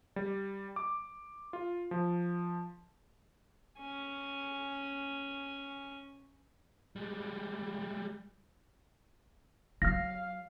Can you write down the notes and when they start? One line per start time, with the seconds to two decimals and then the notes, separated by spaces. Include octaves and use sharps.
0.16 G3
0.76 D6
1.53 F4
1.91 F3
3.78 C#4 G#5
6.96 G3 G#3
9.82 F#3 F5 F6 A#6